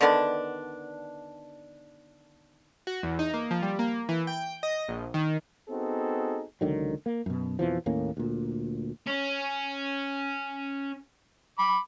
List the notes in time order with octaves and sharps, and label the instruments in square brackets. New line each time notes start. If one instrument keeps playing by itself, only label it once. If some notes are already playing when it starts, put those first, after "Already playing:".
[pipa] D3 D#3 B3 D4
[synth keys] F#4
E2
D#4
A#3
F3
G3
A#3
E3
G5
D#5
A#1
D#3
[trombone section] B3 C4 D#4 F#4 G#4 A4
[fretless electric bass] C#2 D3 D#3 F#3
A#3
F#2 B2
F2 B2 E3 F3
D#2 A2 A#3 C#4
D2 A#2
[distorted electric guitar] C#4
[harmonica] B5 D6